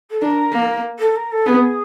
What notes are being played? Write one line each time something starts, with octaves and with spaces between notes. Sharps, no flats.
A4
D4 A#4
A#3
A4
A#4
A4
B3 G#4